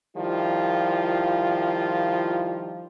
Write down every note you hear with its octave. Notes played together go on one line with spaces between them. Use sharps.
D#3 F3 G3 E4 F4